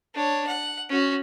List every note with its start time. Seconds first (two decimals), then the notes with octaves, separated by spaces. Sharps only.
0.14 D4 C#5
0.47 F#5
0.89 C#4 F#4